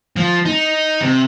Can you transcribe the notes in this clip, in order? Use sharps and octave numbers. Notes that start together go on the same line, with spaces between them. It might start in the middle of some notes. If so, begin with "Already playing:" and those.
F3
D#4
C3